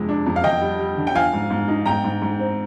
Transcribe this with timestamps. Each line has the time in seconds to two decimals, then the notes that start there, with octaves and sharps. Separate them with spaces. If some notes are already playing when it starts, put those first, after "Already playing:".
Already playing: F2 C3 G#3
0.09 D4
0.26 F2
0.36 F5
0.44 D3 D#5 G5
0.61 G3
0.79 G3
0.97 D3
1.07 G5
1.15 F3 F5 G#5
1.33 G#2
1.50 G#2
1.68 D#4
1.86 G#2 G5 A#5
2.04 G#2
2.22 G#2
2.39 C4